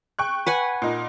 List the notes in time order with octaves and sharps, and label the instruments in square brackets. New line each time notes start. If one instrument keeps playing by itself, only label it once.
[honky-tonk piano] G5 C#6 F#6
[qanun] B4 F#5 G#5
[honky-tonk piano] A#2 D#4